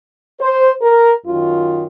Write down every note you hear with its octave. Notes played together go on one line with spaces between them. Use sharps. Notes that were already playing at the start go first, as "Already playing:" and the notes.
C5
A#4
F#2 D#3 F4